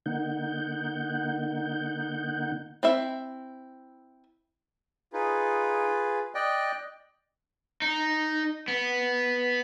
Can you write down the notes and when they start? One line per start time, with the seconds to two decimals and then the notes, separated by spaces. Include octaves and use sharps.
0.06 D3 A#3 D#4 F#5 G6
2.83 C4 E4 E5
5.13 D#4 F4 G#4 B4
6.35 D5 D#5 G5 F#6
7.82 D#4
8.68 B3